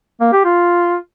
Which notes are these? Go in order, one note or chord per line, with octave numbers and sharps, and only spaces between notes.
A#3
G4
F4